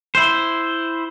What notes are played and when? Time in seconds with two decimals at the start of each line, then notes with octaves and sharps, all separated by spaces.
0.15 E4 C5